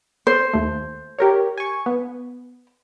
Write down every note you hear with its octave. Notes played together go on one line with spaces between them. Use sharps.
C5
D#2 A3
G4 A#4 C#5
G#5 C#6
B3